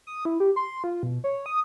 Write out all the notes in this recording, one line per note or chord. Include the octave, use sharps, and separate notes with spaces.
D#6
E4
G4
C6
F4
B2
C#5
D#6